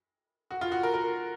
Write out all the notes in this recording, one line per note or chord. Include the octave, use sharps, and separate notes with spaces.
F#4
F4
F#4
A#4
A#4